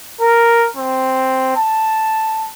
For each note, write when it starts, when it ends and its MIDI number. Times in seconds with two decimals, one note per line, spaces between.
0.21 0.68 70
0.77 1.53 60
1.56 2.50 81